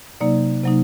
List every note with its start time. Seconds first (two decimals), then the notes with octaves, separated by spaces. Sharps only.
0.21 C3 F#3 A#3 D#4 D5
0.64 C3 F#3 A#3 D#4